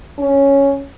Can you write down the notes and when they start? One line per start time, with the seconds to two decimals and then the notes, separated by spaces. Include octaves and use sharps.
0.18 C#4